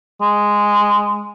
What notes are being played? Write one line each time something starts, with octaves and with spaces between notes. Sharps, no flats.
G#3